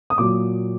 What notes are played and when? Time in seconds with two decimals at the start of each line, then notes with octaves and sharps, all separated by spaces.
0.10 D#6
0.18 A#2 F#3 D6